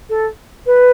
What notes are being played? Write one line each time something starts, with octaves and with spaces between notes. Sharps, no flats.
A4
B4